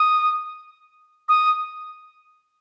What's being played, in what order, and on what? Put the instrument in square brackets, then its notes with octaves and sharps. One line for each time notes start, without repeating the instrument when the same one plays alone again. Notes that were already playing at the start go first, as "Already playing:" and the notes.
Already playing: [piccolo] D#6
D#6